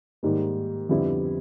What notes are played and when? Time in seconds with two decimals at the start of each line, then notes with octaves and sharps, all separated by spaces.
0.23 G#2 D#3 G3 A#3
0.89 F2 D3 G3 B3 E4